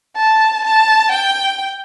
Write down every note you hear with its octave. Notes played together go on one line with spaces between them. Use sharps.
A5
A5
G5